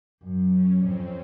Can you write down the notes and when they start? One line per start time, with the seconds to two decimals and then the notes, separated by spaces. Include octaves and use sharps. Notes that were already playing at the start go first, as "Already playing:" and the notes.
0.23 F#2
0.53 C#4
0.83 F2 C4